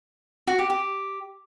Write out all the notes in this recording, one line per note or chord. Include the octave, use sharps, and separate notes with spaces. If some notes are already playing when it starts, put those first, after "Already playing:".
F#4
G4
G4